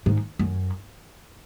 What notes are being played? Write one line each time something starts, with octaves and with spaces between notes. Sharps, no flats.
G#2
F#2